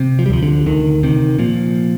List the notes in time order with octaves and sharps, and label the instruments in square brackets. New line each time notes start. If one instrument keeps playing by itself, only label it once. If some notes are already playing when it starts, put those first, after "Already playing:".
Already playing: [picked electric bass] C3
F3
G3
D2 F3
D3
D2 D#3
C3 D#3
A#2 F3